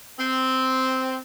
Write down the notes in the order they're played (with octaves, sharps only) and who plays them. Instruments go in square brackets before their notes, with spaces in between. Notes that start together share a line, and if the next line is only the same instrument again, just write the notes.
[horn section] C4